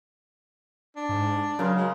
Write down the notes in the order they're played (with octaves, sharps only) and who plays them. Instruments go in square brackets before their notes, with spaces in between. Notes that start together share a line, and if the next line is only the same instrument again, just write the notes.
[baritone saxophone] D4
[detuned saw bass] G#2
[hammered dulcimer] C#3 A#4 C6 [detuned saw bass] F#3
[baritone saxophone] G#3